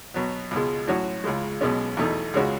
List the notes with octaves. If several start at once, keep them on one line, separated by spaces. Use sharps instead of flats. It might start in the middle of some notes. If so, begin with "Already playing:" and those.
B2 F#3 B3
C#2 B2 G#3
A2 F#3 C#4 F#4
C#2 C#3 G#3
B1 B2 G#3 C#4
E2 B2 A3 D#4
C#2 C#3 G#3 C#4 F#4